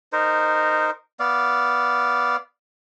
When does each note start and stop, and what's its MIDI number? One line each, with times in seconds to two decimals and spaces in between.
0.13 0.91 63
0.13 0.91 70
0.13 0.91 72
1.20 2.37 59
1.20 2.37 74
1.20 2.37 77